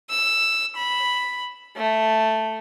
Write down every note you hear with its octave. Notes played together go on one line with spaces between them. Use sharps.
E6
B5
A3